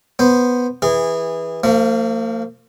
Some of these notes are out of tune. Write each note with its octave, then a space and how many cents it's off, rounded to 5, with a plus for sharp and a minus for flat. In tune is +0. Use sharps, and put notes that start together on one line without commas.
B3 +0 C5 +0
E3 -15 G#4 -20
F3 +0 A#3 -45